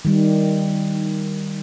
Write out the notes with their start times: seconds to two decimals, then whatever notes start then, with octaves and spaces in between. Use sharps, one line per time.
0.05 D#3 G3